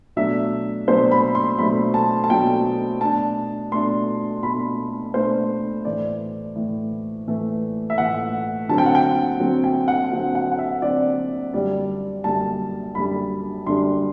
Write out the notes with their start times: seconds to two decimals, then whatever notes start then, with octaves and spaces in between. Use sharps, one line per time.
0.16 B2 F#3 A3 D4 E5
0.87 B2 F#3 A3 D4 C5
1.11 B5
1.35 C6
1.59 B2 F#3 A3 D4 B5
1.94 A5
2.24 A5
2.30 B2 F#3 A3 D4 G5
3.01 B2 A3 D4 A5
3.72 B2 A3 D4 C6
4.43 B2 A3 D4 B5
5.14 B2 A3 D4 C5
5.85 A2 E3 A3 D5
6.55 A2 E3 A3
7.27 A2 E3 A3
7.90 E5
7.98 A2 E3 A3 F#5
8.69 D3 F#3 C4 A5
8.78 G5
8.86 F#5
8.95 G5
9.40 D3 F#3 C4
9.64 G5
9.88 F#5
10.11 D3 F#3 C4
10.35 F#5
10.52 F#5
10.59 E5
10.82 D3 F#3 C4 D5
11.53 F#2 D3 G3 D4 D5
12.24 F#2 D3 G3 D4 A5
12.95 F#2 D3 G3 D4 B5
13.66 F#2 D3 G3 D4 C6